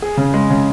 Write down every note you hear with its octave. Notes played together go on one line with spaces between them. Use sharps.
G#4
C#3
G#3
C#3